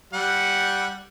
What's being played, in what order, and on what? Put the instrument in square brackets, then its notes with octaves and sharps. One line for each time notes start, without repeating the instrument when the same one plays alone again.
[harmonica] G3 F#5